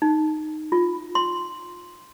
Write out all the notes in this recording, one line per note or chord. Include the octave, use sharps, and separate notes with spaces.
D#4
F4
C6